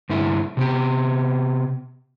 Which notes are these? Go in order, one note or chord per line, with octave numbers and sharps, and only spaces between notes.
G2 D3 E4
C3 B3 G4